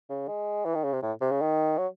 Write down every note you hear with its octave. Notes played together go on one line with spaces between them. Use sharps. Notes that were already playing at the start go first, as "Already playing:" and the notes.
C#3
G#3
E3
D#3
C#3
C3
A2
C3
C#3
D#3
F#3